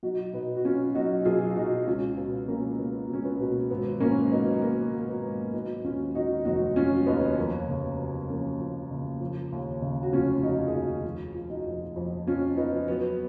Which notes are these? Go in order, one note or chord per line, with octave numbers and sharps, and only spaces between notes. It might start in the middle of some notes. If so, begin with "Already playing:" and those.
B1 D#4 F#4
B2 B3 D#4
F#4
F#3 C#4 F4
B1 D#4 F#4
B1 F4 G#4
B2 D#4 F#4
C#2 C#4 F4
B2 B3
F#3 A#3 C#4
C#2 B3
C#2 C#4
B3
B2
G#1 B3
G#2 A#3 C#4
F#3 B3 D#4
G#1 A#3
G#1
B3
G#2
F#3 B3 D#4
D#2 C#4 F4
D#3 D#4 F#4
F1 D#4 F#4
F#3 C#4 F4
D#2 B3 D#4
F2 A#3
C#3
B3
F#3
F2 A#3 C#4
F2
C#3
F3
D#2
C#3
F#4
F1 C#4 F4
F4
F3 D#4 F#4
G#4
D#2 D#4 F#4
F3 F4 G#4
F3
D#4 F#4
F2
F2
F3 C#4 F4
F3 B3 D#4
F#3 B3